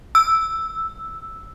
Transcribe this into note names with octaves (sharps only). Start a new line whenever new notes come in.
E6